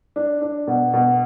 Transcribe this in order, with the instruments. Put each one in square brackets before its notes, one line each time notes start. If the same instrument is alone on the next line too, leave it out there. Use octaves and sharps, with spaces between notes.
[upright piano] D4
D4
B2
B2